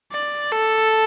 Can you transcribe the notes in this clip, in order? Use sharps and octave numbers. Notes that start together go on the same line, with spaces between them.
D5
A4